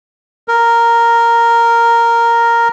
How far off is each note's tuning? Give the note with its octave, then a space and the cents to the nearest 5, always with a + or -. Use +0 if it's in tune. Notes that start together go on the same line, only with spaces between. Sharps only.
A#4 -5